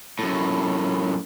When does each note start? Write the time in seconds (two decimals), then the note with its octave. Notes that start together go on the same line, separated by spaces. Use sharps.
0.19 F#2 A2